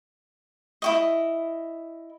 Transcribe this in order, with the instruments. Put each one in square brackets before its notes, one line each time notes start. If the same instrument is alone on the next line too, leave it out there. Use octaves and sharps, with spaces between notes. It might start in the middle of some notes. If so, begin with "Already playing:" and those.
[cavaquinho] E4 F#4 D#5